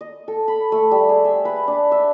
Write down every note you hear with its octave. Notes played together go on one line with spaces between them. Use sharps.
D#5
A4
B5
A3
G3
G#4
E5
B4
D4
E5